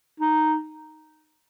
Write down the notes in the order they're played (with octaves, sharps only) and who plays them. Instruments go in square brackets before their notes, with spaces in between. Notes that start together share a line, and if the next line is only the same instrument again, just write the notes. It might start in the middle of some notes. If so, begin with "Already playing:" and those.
[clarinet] D#4